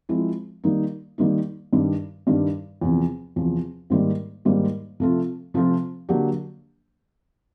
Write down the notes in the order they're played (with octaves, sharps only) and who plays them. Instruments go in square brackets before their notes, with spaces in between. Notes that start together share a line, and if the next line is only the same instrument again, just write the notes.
[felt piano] F3 G#3 C4 E4
D#3 G3 A#3 D#4
D#3 G3 A#3 D#4
G2 D#3 G3
G2 D#3 G3
E2 C3 F3
E2 C3 F3
G#2 D#3 G3 A#3
G#2 D#3 G3 A#3
C3 F3 A3 C4 F4
C3 F3 A3 C4 F4
D3 F#3 A#3 D4 G4